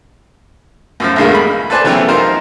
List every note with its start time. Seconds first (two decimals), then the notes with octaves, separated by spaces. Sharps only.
1.00 F#2 A2 F3
1.16 B1 E2 G2 D3 G#3 A#3
1.34 B5
1.70 A4 B4 C5 D5 G#5 A5
1.84 C#3 E3 F#3 A3 B3 C4
2.08 F3 D#4 A#4 C5